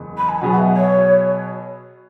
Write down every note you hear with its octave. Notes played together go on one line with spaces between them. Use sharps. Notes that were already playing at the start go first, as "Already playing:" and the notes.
Already playing: F#1 E2 E3 G#3 B3
B5
G#5
B2 F#3 B3 G#4 F#5
F#5
E5
C#5